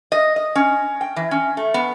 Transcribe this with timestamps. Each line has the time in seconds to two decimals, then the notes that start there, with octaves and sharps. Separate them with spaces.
0.12 D#5
0.36 D#5
0.55 C#4
1.01 G5
1.16 E3
1.31 C#4
1.57 A3
1.74 B3